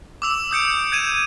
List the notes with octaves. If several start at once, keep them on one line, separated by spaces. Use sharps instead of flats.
D6 E6 F7
D#6 G6 C#7 D7
G6 G#6 D#7 E7